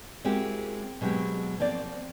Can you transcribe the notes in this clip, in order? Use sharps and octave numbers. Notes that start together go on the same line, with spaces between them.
G#3 A#3 C4 E4 F#4 G4
B2 F#3 G#3 C4 G4
F3 A#3 C4 D5